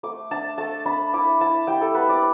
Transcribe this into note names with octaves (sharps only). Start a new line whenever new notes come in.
A3 D6
D4 A5
A3 A5
D4 B5
E4 D6
E4 A5
G3 G5
A4
B3 B4
D5